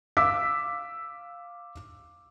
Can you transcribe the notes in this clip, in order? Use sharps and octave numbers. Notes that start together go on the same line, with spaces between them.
F5 D6 E6 B6